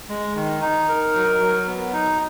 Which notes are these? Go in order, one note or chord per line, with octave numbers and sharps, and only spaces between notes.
G#3
D#3
D#4
A#4
F#3
F#3
B3
D#4